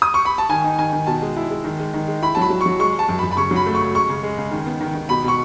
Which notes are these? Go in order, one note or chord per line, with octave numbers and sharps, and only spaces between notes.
D#6
C#6
B5
A5
D#3 G#5
D#4
D#3 G#5
D#3
B2 A5
G#3
E4
G#3
D#3
G#3
D#3
G#3
E4 B5
F#3 A5
B5
F#3
C#6
F#3
G#3 C#6
G#3
A5
F#2
B5
F#2
B5
C#3 C#6
F#3
B5
A3
C#6
C#3
G#3 C#6
C#3
G#3
C#3
D#3
B3
D#3
D#3
B2 B5
B2 C#6